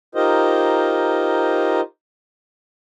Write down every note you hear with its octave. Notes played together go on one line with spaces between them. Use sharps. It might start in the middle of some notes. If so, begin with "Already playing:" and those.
D#4 F4 G4 A#4 C5 D#5